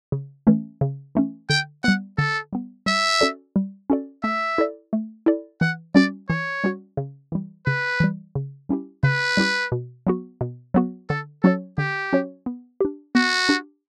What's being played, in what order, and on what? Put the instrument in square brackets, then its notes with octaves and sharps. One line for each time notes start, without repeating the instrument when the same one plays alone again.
[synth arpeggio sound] C#3
E3 A3 C#4
C#3
E3 A3 C#4
[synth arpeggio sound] D3 [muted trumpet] G5
[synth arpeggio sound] G3 B3 [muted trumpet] F#5
[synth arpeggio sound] D3 [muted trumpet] A4
[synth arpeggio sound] G3 B3
[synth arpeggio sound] G3 [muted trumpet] E5
[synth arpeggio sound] C#4 F#4 A4 D5
G3
C#4 F#4 A4 D5
[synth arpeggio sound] A3 [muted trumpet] E5
[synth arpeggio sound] E4 A4 D5
A3
E4 A4 D5
[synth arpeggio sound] E3 [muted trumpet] F#5
[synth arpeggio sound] G3 C#4 F#4 [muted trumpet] D5
[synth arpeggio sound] E3 [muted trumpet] C#5
[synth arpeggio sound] G3 C#4 F#4
C#3
E3 G3
[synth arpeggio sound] C#3 [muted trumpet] B4
[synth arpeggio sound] E3 G3
C#3
G3 C#4 E4 G4
[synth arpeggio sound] C#3 [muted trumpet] B4
[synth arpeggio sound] G3 C#4 E4 G4
B2
F#3 B3 F#4
B2
F#3 B3 F#4
[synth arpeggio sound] D3 [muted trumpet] A4
[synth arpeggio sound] F#3 C#4 F#4 C#5 [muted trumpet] A4
[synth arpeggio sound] D3 [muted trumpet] G4
[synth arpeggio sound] F#3 C#4 F#4 C#5
B3
D4 G4
[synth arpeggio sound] B3 [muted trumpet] F#4
[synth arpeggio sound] D4 G4